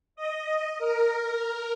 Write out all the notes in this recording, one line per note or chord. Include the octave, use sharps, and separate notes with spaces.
D#5
A#4